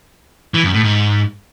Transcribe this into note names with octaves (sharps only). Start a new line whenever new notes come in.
E3
F#2
A2
G#2